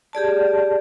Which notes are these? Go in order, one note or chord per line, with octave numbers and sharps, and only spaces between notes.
G4 G#4 D5 A5